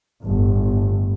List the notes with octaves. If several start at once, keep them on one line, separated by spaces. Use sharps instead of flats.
G1 A2